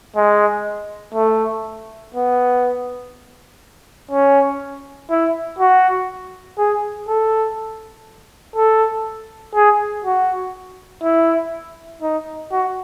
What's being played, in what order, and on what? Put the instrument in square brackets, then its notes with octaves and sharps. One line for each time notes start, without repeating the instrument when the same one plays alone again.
[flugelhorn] G#3
A3
B3
C#4
E4
F#4
G#4
A4
A4
G#4
F#4
E4
D#4
F#4